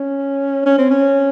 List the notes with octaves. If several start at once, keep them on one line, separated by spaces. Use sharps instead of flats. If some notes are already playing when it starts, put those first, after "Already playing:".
Already playing: C#4
C#4
C4
C#4